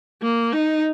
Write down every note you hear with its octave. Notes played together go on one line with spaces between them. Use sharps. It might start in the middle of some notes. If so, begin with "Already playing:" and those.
A#3
D#4